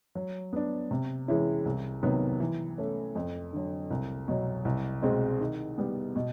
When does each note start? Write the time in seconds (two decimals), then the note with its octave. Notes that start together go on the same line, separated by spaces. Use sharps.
0.15 F#3
0.53 B3 D4
0.91 C3
1.28 E3 G#3 C#4 E4
1.65 C2
2.03 C3 D#3 F#3 B3
2.40 E3
2.78 A3 C#4
3.15 F2
3.53 D3 F#3
3.90 C2
4.28 B2 F#3
4.65 C2
5.02 B2 G#3 C4
5.40 D#3
5.78 G3 B3
6.16 B2